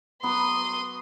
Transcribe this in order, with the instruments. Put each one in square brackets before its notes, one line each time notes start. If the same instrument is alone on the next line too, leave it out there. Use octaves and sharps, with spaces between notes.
[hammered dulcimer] F#3 B3 [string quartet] C6 D#6